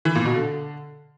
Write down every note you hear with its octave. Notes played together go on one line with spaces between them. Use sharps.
E3
A#2
B2
D3